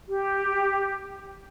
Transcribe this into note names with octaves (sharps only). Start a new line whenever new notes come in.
G4